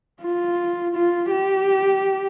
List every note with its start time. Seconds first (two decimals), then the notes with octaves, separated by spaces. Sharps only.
0.22 F4
0.95 F4
1.31 G4